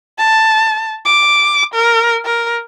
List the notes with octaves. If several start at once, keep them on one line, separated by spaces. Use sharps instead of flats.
A5
D6
A#4
A#4